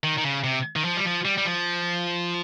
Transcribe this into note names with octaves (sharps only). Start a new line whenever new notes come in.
D#3
D#3
C#3
C3
D#3
F3
G3
F3
G3
G3
F3